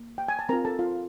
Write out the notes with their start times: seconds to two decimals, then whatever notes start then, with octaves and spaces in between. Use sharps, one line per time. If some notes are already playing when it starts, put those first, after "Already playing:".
Already playing: A#3
0.18 G5
0.28 G#5
0.39 A5
0.49 C4 F4 A#4 A#5
0.65 A4 A5
0.79 F4 F5